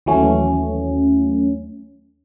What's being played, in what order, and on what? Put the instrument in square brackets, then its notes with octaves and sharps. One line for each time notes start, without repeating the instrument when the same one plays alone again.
[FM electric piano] D#2 E3 F#3 A3 C#4